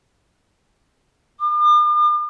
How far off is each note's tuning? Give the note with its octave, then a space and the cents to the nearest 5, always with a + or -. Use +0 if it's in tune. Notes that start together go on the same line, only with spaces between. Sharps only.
D6 +45